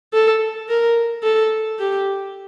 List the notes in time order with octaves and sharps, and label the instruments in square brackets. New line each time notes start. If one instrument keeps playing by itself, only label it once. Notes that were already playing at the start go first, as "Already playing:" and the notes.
[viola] A4
A#4
A4
G4